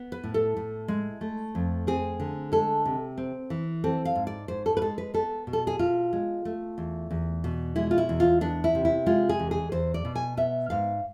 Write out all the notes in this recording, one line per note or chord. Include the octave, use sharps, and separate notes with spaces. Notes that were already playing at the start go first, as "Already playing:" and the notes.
Already playing: B3
B4
A2
A4
A2
G#3
A3
F2
C4 G#4
D3
G#3 A4
C3
C4
E3
C4 A4
F5
G#2
D5
G#2 C5
A4
B4
G#3 A4
B4
B3 A4
B2
A4
G#4
B2 F4
G#3
A3
E2
E2
B2
G#3 E4
F4
E4
E2
F4
B3 D4
E4
C3
E4
G#3 F4
G#4
E2
G#4
E2 C5
D5
B2
G#5
B3 E5
G#2 F5